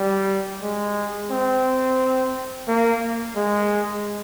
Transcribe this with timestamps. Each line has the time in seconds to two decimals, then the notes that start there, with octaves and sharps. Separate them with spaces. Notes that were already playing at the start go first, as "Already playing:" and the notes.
Already playing: G3
0.62 G#3
1.30 C4
2.68 A#3
3.36 G#3